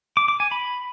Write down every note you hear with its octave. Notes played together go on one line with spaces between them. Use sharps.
D6
D6
G#5
B5